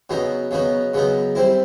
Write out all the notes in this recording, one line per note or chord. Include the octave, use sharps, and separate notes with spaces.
C#3 F#3 B3 D#4
C#3 F#3 B3 D#4
C#3 F#3 B3 D#4
G3 C4 E4